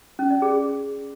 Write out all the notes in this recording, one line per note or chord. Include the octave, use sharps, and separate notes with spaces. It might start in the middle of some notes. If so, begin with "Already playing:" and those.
C#4
D5
G#4